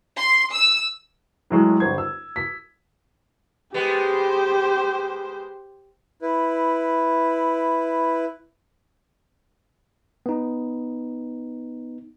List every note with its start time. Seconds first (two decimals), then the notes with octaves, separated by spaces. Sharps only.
0.16 C6
0.53 E6
1.50 A2 F#3 G#3
1.80 G1 C5 G#6
1.98 E6
2.36 B6
3.74 G#3 B3 G4 C5
6.22 E4 B4
10.26 B3 D#4